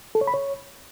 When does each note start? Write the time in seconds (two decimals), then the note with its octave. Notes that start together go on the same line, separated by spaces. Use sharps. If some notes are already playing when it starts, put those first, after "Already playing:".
0.15 A4
0.21 C#5
0.27 B5
0.34 C#5